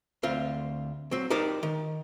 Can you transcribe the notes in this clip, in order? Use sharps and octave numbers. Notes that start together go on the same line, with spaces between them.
D2 C4 F4
F#3 C4
D#4 G4 A#4 C5 D5
D#3